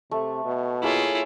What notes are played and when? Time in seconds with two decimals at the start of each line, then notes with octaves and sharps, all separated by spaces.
0.11 C3 A3
0.45 B2
0.83 A#3 E4 F4 G#4 C#5